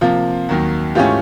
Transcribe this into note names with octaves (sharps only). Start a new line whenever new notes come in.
C3 F3 A#3 F4
D#2 D#3 F#3
G#2 E3 A3 C#4 F4 G4